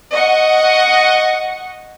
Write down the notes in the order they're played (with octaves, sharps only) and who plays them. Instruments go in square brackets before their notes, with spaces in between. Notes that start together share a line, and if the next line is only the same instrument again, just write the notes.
[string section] D#5 F#5 C#6